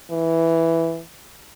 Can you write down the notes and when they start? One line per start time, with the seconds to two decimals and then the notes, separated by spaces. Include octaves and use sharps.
0.11 E3